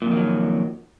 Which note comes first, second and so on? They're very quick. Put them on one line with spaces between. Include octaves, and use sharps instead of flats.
A#2 F2 D#3 F#3